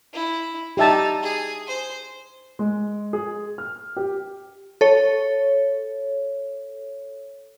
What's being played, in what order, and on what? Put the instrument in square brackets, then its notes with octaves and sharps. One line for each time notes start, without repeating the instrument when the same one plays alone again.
[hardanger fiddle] E4
[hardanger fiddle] D#4 [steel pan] G4 E5 A5
[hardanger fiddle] G#4
C5
[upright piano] G#3
G#4
F6
G4
[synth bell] A4 C#5